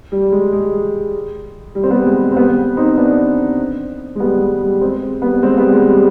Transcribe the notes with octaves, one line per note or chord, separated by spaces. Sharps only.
G3
G#3
G#3
G3
C4
G3 B3
G#3
G#3
C4
G3 B3
C4 D#4
B3 D4
G#3
G3 B3
G#3
G3
G#3 C4
G3 B3
G#3 C4
G3 B3
G#3
G3